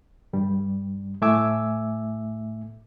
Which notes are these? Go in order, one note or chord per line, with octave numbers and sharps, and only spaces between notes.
G2 G3
A2 A3 E5 G#5 D6 E6